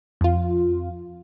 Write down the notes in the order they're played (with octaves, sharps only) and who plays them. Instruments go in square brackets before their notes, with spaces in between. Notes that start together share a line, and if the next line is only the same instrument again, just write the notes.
[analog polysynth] F2 F4